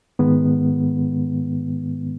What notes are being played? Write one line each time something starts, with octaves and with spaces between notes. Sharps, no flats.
G#2 D#3 G#3 B3